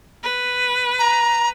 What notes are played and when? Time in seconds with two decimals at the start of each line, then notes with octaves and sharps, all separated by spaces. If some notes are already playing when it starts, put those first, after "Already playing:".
0.23 B4
0.99 A#5